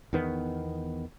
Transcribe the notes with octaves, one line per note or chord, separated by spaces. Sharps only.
E2 D#3 B3